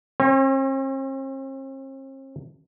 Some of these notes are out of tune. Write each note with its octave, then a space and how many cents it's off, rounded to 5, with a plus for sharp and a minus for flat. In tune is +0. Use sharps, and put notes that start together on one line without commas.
C4 +45 C#5 -30